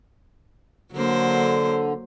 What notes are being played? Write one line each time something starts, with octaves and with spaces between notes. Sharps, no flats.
D3 F#3 A#3 C5